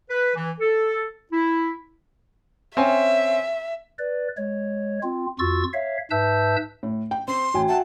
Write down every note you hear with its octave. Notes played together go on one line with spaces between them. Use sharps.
B4
E3
A4
E4
C4 C#4 E5 G#5
B4 D5
G#3 C#5
C4 F4
F2 F4 F#4 C#6 E6 A6
C#5 E5 F5
G#2 B4 E5 A5 E6 G6
A2
G5
C4 C6
A1 F#4 G5 G#5
E5 F#5 A5